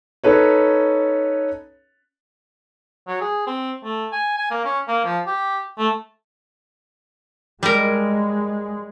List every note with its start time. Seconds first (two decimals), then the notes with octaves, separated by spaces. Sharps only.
0.24 C#4 D#4 A4 B4 C#5
3.07 F#3
3.21 G#4
3.47 C4
3.84 A3
4.12 G#5
4.38 G#5
4.51 A#3
4.65 C#4
4.88 A#3
5.05 F3
5.27 G4
5.79 A3
7.63 G3 G#3 A#4